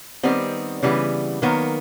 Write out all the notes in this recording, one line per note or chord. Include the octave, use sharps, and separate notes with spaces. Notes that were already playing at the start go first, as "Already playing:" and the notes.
D#3 G3 B3 C4
C#3 E3 G3 B3
D#3 F#3 A#3 B3